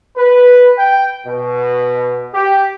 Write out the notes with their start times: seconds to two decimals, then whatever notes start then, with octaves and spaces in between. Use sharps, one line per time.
0.16 B4
0.78 G5
1.26 B2
2.34 G4